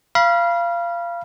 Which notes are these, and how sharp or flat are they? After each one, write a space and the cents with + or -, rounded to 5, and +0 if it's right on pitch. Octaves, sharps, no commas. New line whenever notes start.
F5 -20 B5 -30